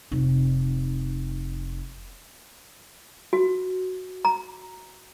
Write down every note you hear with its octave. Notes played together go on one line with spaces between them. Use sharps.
F1 D#4
F#4
A#5